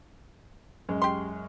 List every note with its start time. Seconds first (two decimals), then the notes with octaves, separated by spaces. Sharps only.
0.89 F#2 G#3
1.02 G4 C6